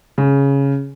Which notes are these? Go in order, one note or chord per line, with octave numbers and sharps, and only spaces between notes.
C#3